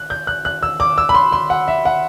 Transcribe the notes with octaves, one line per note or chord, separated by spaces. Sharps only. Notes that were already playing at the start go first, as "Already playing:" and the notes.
Already playing: F#6
G6
F#6
F#6
E6
D6
E6
B5
C6
C6
F#5
E5
F#5